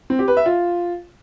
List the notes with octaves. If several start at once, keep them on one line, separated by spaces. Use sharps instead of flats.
C4
G4
B4
E5
F4